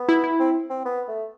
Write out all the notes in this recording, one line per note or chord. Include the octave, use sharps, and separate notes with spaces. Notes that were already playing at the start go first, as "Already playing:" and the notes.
Already playing: B3
E4
E4
C4
C4
B3
A3